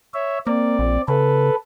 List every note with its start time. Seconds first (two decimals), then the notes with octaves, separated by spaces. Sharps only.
0.14 C#5 E5
0.47 A#3 C4 D5
0.79 A#1
1.08 C#3 A4 B4